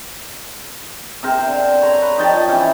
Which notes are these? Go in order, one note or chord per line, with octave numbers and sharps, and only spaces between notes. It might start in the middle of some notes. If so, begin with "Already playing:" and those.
C3 A#4 C5
D3
C#5 A#5 C6
B4
F3 D#4 G5 A5
C3 E3 C#4